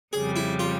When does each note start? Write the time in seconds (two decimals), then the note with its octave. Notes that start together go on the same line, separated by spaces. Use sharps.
0.13 F2 C#3 G3 G#4
0.36 E4
0.59 F4